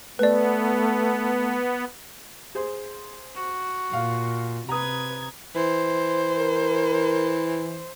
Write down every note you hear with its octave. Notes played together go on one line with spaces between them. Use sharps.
A3 B3 B4 D5
G#4 C5
F#4
A#2 F5
C3 B4 A#5 D#6 G#6
E3 C5
A#4